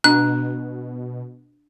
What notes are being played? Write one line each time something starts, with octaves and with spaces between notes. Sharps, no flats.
B2 D4 F#6